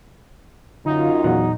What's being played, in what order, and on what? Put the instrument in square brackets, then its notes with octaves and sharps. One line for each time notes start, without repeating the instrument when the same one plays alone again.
[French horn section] F#2 F4 [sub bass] D3 [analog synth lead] D#4
[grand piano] E2 F#3 F#5 [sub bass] A#2